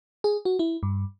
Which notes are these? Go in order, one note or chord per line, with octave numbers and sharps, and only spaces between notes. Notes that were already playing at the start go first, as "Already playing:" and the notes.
G#4
F#4
E4
G2